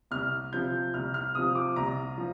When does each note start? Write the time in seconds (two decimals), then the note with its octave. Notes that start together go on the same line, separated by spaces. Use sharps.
0.11 C2 F6
0.52 C3 F3 G6
0.94 C2 F6
1.14 F6
1.35 C3 F3 D#6
1.55 D6
1.76 C2 A#5
2.18 F3